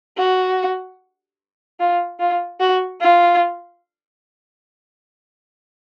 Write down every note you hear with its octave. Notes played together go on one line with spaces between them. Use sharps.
F#4
F4
F4
F#4
F4